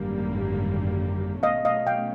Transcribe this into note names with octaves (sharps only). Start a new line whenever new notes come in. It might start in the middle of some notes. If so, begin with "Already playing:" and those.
Already playing: G#1 F#2 D3 G3 A#3
B2 F#3 A3 C#4 D#5 F5
D#5 F5
F5 G5